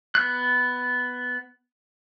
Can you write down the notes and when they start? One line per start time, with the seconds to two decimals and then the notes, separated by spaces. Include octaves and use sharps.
0.15 B3 F#6